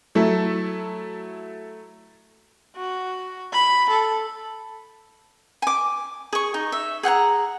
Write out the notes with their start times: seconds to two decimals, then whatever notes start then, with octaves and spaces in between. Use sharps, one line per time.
0.15 F#3 A3 E4 A4
2.77 F#4
3.53 B5
3.90 A4
5.62 G#5 D6
6.33 G#4 C#6
6.54 D#4
6.72 E5
7.03 G#4 F#5 G5 A#5